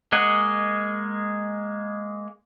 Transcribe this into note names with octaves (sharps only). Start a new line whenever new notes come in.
G#3 A#3 G#4 D#5 F#5